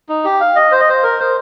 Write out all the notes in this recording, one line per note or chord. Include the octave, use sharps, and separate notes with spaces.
D#4
G4
F5
D#5
C5
D#5
C5
A#4
C5